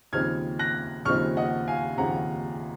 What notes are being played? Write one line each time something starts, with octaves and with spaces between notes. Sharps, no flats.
D#2 C#3 F3 C4 D#4 F6 G#6
F#6 A#6
D#2 C#3 F3 C4 D#4 C#6 F6
D#5 F#5
F5 G#5
D#2 C#3 F3 C4 D#4 F#5 A#5